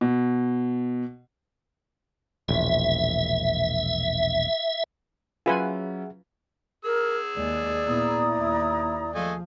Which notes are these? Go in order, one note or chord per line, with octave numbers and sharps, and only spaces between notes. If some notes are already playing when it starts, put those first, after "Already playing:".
B2
E1 A#1 E5
F#3 C#4 F4 G#4 B4 E5 F#5 G#5
G#4 A#4 E6
D#2 G#3 D5
A#2 B3 E4 A#5 D#6
D#2
F3 A3 G#4 D#5 F5 G#5